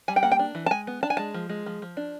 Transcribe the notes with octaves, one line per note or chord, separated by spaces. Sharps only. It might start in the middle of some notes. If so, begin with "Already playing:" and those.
G3 G#5
G5
A#3 F#5
G5
D4
E3
A5
G#3 G#5
B3
D4 A5
G#5
G#3 A5
F3
G#3
F3
F3
D4